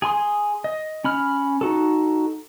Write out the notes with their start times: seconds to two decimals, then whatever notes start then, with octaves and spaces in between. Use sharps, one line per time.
0.02 G#4 G#5 C6 D#6
0.64 D#5
1.04 C#4 B5 F6
1.61 D#4 F#4 A4